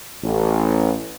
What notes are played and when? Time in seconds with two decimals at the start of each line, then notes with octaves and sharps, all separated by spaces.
0.24 A1